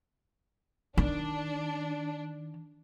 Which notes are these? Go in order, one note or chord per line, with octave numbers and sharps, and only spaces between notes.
D#3 D4